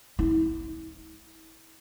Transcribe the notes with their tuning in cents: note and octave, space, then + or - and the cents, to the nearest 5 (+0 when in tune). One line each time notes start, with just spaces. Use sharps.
E4 -30